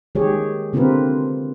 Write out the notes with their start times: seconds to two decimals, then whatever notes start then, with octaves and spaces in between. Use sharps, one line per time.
0.15 D#3 G#3 G4 G#4 C#5
0.73 D3 C4 F4 G4 A#4 B4